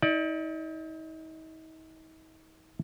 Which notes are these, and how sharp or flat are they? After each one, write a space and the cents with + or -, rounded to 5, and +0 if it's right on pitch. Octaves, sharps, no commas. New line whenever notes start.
D#4 +40 D5 +10